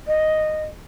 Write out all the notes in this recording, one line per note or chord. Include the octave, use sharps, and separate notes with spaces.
D#5